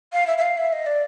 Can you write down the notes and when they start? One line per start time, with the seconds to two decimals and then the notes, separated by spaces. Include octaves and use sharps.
0.12 F5
0.27 E5
0.37 E5
0.41 F5
0.57 E5
0.72 D#5
0.86 D5